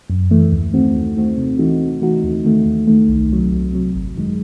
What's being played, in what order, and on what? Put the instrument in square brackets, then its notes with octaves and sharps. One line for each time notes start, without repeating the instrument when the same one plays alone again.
[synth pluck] F#2
E3 A3
D#2
D#3 A3 C4 F#4
D#2
D#3 A3 C4 F#4
C3
E3 A3 D#4 F#4
C3
E3 A3 D#4 F#4
D#2
D#3 A3
D#2
D#3 A3
C2
C3 F#3
C2
C3 F#3
G#1
F#2 D#3 G#3